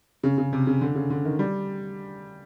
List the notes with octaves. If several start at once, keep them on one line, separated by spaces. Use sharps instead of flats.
C#3
C#3
C3
C#3
D3
C#3
D3
D#3
G3